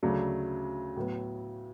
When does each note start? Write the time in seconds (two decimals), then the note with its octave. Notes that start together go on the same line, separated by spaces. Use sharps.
0.03 D2 C#3 F#3 A3 D4
0.96 A2 F#3 B3